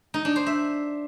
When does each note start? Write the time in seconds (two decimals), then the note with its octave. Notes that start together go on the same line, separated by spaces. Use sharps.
0.14 D#4
0.25 D4
0.36 C5
0.46 E5